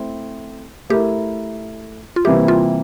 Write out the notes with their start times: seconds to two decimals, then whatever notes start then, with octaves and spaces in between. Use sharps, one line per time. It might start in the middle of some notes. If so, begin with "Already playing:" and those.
Already playing: A3 C4 E4
0.90 A3 E4 G4 A#4
2.16 F4
2.25 C3 E3 G3 A#3 E4 G4
2.48 F4